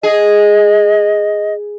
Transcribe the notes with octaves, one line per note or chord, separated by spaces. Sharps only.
G#4 D#5